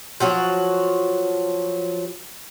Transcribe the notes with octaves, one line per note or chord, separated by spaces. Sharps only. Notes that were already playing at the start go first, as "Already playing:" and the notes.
F3 F#3 F#4 C#5